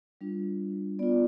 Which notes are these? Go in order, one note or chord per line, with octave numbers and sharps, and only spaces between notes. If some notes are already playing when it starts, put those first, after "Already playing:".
G3 D4 F4
B3 F4 D5